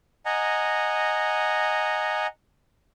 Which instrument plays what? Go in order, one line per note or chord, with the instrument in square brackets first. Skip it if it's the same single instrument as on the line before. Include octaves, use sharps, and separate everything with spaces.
[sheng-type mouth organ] D#5 F#5 G#5 A#5